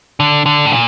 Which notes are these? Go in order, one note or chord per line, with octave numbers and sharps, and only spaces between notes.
D3
D3
A2
A#2